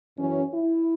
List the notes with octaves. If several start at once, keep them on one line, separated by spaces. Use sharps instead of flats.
F#2 E3 C#4
E4